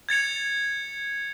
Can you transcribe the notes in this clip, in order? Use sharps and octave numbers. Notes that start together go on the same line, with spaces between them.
G#6 A6 C#7 F7